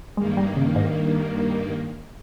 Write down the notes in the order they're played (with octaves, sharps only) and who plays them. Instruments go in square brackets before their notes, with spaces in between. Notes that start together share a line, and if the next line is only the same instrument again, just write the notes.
[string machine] G2 D#3 A#3 [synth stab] G#3
[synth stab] G3
C#3
G#2